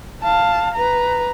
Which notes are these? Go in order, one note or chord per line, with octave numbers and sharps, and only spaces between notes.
F5 A5
B4 A#5